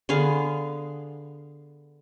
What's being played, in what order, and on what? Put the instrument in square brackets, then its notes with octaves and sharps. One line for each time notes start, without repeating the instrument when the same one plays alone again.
[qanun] D3 B3 G#4 F5